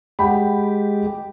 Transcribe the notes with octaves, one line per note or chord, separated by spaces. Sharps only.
G#3 G4 F#5 G5 B5